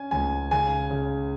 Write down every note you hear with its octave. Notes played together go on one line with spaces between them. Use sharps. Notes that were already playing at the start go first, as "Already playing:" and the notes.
Already playing: C#4 G#5
C#2 G#5
C#3 G#5
C#3